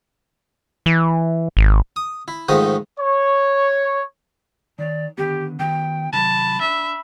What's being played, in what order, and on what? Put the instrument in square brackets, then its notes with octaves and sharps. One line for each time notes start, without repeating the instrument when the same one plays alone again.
[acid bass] E3
G#1
[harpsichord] D#6
E4
G#2 D#3 F3 G#3 A3 D#6
[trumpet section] C#5
[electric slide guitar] D#3 C#5 [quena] D5
[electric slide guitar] D3 D#3 B3 [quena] G4
[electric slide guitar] D#3 B3 F#4 [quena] G5
[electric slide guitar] C3 D#3 F#3 [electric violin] A5 [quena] B5
[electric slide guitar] D4 [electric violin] E5